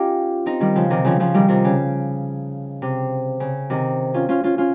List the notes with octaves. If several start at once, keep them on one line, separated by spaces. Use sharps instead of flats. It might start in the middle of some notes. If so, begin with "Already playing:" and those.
Already playing: C#4 D#4 F4 G4
C4 D#4
D#3 G3
C#3 F3
C3 D#3
C#3 F3
C#3 F3
D#3 G3
C3 D#3
C#3
C3
C#3
C3 D#3
C#4 F4
C#4 F4
C#4 F4
C#4 F4